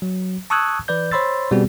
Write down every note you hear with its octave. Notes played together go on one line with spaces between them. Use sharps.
F#3
A5 C#6 D#6 E6 F#6 G#6
E3 B4 D5 G6
C5 C#5 B5 C6 E6 A6
B2 G3 B3 C4 F#4 G#4